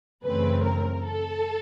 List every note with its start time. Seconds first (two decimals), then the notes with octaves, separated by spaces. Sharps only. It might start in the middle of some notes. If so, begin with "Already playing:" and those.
0.23 F#2 C#3 E3 A3 C4 B4
0.63 A#4
1.04 A4